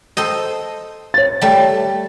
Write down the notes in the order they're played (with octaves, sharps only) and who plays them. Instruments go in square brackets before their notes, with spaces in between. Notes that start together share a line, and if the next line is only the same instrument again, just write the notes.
[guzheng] A4 C5 D#5
[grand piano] C#5 A6
[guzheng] G3 A3